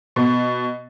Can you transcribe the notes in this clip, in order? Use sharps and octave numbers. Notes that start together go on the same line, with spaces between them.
B2